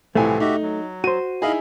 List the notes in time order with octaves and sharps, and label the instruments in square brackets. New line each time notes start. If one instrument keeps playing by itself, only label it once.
[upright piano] C2 A2 G#5 [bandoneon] E3 F3 C4 [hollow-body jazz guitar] A3
[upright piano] D#4 [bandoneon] F#4 G4 E5
[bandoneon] F#3
[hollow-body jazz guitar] F#4 C5 [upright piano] D#7
[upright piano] D#4 E4 G#4 [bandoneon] D#5 F5 B5